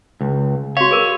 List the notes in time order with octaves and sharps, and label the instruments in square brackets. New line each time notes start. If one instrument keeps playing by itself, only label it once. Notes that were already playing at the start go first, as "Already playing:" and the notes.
[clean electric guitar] C#2
[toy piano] F#4 F5 [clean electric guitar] C#5
[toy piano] G#4 A#4